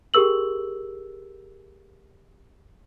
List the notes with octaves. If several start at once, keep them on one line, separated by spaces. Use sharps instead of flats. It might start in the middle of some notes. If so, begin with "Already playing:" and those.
G4 G#4 A#4 E6 F#7